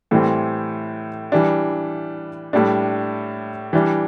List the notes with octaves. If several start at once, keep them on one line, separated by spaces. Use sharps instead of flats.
A2 E3 G3 C4
E3 G3 D4
A2 G3 D4
E3 G3 D4